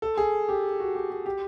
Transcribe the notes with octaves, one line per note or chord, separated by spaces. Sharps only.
A4
G#4
G4
F#4
G4
G4
G4